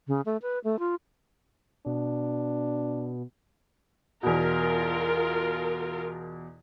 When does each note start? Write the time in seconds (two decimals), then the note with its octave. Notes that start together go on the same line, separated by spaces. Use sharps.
0.08 C#3
0.26 A3
0.42 B4
0.64 A3
0.79 F4
1.86 B2 D4
4.23 E2 B2 F4 A#4